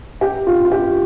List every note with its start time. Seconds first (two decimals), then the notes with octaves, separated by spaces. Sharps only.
0.21 G4
0.47 F4
0.65 F4
0.72 G4